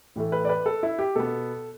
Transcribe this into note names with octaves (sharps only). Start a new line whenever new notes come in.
A2 E3 A3
B4
D5
B4
A4
E4
G4
B2 B3 A4